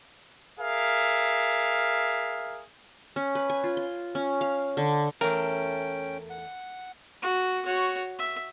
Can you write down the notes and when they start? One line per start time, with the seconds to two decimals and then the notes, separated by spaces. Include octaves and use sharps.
0.60 G#4 A#4 E5 F5
3.16 C#4
3.35 B4
3.50 G#5
3.64 F4
3.77 C6
4.15 C#4
4.41 F5
4.77 D3
5.21 E2 A3 C#4 A#4 G5
6.30 F#5
7.22 F#4
7.65 F#4 C#5
8.19 E5